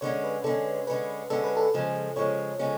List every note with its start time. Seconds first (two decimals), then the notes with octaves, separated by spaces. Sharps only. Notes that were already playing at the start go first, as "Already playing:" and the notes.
0.01 D3 G#3 C#4 C#5
0.24 B4
0.44 D3 G#3 C#4 A4
0.87 D3 G#3 C#4 B4
1.30 D3 G#3 C#4 A4
1.44 B4
1.57 A4
1.74 C#3 F3 G#3 C#4
2.16 C#3 F3 G#3 C#4 C#5
2.59 C#3 F3 G#3 C#4